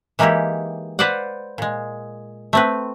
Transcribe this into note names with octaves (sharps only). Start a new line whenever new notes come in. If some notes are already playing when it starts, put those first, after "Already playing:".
E3 G#3 A#3 D#4 E4 G4
B4 C5 D5 F5 F#5
A#2 G#3
A3 C4 B4